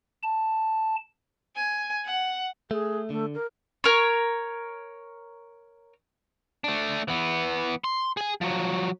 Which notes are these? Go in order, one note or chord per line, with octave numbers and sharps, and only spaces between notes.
A5
G#5
F#5
A3 G#4
D3 A3
A#4
A#4 C#5
A3 D4
E3 B3
C6
G#4 G#5
F3 F#3